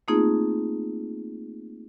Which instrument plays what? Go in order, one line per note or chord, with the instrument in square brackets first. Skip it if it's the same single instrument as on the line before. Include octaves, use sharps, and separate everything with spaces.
[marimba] A3 A#3 C4 D#4 F4 G#4